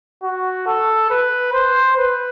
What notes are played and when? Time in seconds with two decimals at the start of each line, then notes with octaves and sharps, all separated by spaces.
0.23 F#4
0.67 A4
1.10 B4
1.53 C5
1.97 B4